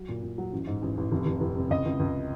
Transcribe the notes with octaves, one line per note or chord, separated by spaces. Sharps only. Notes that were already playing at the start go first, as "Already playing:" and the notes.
Already playing: F#3
A#2
A#2
F#3
A1
G#2
A1
A1
F1
F1
F1
C3
C#2 D#5
C#2
C#2